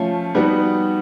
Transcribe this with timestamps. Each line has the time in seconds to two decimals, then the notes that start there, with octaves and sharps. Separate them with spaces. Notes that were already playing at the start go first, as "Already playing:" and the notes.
Already playing: F3 A3 C#4 F4 A4
0.35 G3 B3 D#4 F#4